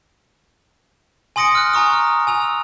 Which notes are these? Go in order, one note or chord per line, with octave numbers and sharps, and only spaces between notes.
G#5 C6 D#6 A#6 C#7 D7
F6 F#6
G#5 A#5 C#6 D#6
F6
G#5 E6 F7